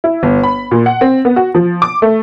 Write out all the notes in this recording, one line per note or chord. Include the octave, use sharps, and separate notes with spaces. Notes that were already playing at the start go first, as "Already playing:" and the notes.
E4
G1
B5
A#2
F#5
C4
B3
F#4
F3
D6
A3